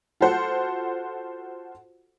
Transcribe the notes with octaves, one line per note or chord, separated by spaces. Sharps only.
F4 F#4 A4 C5 F#5